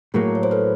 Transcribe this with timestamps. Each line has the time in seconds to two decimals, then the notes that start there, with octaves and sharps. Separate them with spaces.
0.14 A2 F#3 A#3 G#4 A#4
0.35 C#5
0.43 C5
0.51 A4 B4